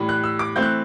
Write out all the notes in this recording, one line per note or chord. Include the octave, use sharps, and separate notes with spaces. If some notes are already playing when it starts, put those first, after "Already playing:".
Already playing: A2 E3 G3
F#6
E6
D6
E3 A3 C4 G6
F#6